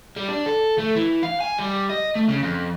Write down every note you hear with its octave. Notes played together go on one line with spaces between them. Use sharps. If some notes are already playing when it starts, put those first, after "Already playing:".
G3
D4
A4
A3
E3
F5
G#5
G3
D#5
A3
C#3
F2